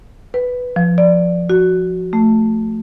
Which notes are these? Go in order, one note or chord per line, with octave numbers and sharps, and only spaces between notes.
B4
F3
D5
F#4
A3